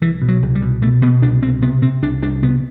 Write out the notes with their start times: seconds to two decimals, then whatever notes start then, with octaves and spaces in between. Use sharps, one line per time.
0.02 C2 E3
0.22 B2
0.28 F#3
0.42 C2
0.55 G3
0.62 B2
0.82 B2 A3
1.02 B2 B3
1.22 C2 D4
1.42 B2 C4
1.62 C3 B3
1.82 C3 C4
2.02 C2 D4
2.22 C2 D4
2.42 C3 B3